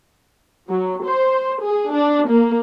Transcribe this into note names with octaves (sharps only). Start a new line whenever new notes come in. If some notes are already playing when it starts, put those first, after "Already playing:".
F#3
C5
G#4
D4
A#3